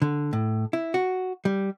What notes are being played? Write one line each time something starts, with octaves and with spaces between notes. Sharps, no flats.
D3
A2
E4
F#4
G3